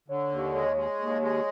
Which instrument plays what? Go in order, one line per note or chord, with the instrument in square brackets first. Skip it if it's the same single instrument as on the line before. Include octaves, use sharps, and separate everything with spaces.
[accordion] D3 [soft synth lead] C#5
[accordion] D#2
G#3
G#3
D#2
G#3